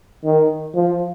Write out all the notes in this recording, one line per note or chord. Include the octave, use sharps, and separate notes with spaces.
D#3
F3